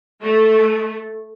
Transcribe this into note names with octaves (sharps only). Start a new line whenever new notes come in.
A3